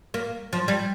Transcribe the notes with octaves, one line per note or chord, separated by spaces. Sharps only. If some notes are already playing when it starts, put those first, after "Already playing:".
A#3
F3
G3